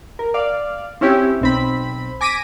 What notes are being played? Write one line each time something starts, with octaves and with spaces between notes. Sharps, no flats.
A#4
D5 F5
C4 C#4 E4 G4
B1 C4 B5
G#5 D6 A#6 B6 D7 D#7